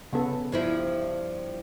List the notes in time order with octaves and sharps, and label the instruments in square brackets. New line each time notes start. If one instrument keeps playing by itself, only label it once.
[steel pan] C#3 B3 A4
[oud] G2 F3 E4